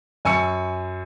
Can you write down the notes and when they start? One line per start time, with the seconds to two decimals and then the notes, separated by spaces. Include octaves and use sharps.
0.25 F#2 G#5 C#6 E6 C#7